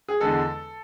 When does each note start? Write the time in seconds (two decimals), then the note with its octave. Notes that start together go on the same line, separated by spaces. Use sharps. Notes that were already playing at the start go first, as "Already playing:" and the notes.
0.08 G#4
0.20 E2 D3 G#3 A4